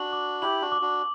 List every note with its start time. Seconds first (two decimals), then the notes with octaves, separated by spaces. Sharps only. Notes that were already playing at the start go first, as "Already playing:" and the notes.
Already playing: D4 F#4 F#7
0.13 D6
0.42 E4 G4 F#7
0.62 D4 F#4
0.72 D6
0.81 D4 F#4